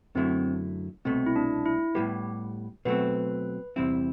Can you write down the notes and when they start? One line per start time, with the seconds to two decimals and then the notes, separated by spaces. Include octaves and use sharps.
0.15 F#2 D3 F#3 A3 C4 E4
1.05 C2 B2 A3 C4
1.26 E4
1.36 D4
1.65 E4
1.95 A2 G3 B3 G4
2.85 B2 F#3 A3 C4 B4
3.76 E2 C3 G3 C4 E4